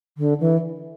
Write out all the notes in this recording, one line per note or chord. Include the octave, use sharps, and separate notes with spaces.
D3
E3